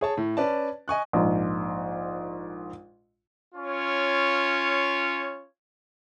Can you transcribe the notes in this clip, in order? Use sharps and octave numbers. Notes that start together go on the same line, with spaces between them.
G#4 C#5 A5
A2
C#4 B4 D5 A5
D#5 G#5 C#6 F#6
A#1 G#2
C#4 F4 C#5